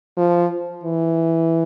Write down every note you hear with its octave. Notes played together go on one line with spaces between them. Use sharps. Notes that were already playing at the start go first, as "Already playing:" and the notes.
F3
E3